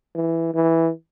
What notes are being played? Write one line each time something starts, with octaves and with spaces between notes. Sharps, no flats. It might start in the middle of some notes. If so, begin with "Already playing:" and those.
E3
E3